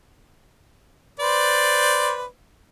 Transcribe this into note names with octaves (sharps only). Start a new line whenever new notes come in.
B4 C5 D5